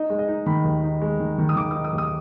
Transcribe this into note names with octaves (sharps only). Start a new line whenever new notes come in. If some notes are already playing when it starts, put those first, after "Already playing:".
Already playing: D#4 D#5
G#3
D#5
D#4
D#3 B5
D#2
D#4
G#3
D#3
D#3
D#6
D#3 D6
D#6
D#4
D#6
D#2
D#6